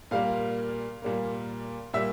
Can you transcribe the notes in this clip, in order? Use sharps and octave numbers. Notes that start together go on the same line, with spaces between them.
A#2 G3 A#3 F5
A#2 G3 A#3
A#2 G3 A#3 E5